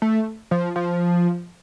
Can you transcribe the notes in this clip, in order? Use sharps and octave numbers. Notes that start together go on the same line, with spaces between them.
A3
F3
F3